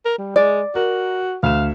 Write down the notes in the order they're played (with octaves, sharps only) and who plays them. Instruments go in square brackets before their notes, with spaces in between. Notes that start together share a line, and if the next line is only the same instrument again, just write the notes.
[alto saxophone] A#4
G3
[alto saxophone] G#3 [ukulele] D5
[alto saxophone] F#4 [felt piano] A#4
[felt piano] D2 E7 [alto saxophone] F5